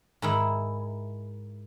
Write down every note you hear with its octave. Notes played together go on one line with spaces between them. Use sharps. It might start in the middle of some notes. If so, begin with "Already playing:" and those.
G#2 D#3 E4